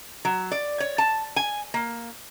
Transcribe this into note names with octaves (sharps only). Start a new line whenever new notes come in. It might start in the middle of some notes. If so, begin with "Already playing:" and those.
F#3
D5
C#5
A5
G#5
A#3